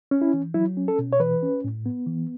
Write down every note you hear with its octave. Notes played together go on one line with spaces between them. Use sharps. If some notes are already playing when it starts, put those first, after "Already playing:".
C#4
E4
E3
F#3 E4
C#4
A4
B2
C#5
E3 B4
C#4
A2
B3
E3